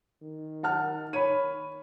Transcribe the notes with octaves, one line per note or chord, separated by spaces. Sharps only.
D#3
F#5 A5 F6
C#5 B5 D#7